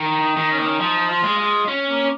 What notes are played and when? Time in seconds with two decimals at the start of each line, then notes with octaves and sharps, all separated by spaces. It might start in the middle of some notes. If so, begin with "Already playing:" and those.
Already playing: D#3
0.22 D#4
0.37 D#3
0.51 C#4
0.59 A#3
0.66 C#4
0.80 F3 D#4
1.10 F4
1.24 G#3
1.39 F4
1.68 C#4
1.90 A#3